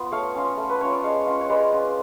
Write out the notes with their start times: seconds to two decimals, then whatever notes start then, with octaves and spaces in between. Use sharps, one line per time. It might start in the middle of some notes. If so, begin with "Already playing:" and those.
Already playing: B3 F4
0.12 A3 C#5 F5
0.35 C#4 F4
0.57 A3
0.69 B4
0.80 C#4 F4 C#5
0.92 D5
1.03 G#3 C#5 F5
1.27 C#4 F4
1.41 C#5
1.49 G#3 B4 D5
1.72 C#4 F4